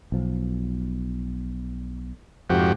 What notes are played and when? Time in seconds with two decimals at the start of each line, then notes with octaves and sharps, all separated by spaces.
0.12 B1 F3
2.50 F2 G#2 C3 F#4 G4